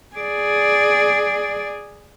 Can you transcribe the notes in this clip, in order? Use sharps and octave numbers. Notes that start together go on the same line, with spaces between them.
G#4 D5